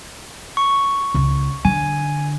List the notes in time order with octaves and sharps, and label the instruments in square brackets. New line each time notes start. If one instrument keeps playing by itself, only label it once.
[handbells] C#6
[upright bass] C#2
[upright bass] D3 [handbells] G#5